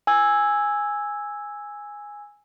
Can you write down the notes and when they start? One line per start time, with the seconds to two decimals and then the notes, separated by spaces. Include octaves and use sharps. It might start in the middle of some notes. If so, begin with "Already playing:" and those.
0.07 G#5 E6 G#6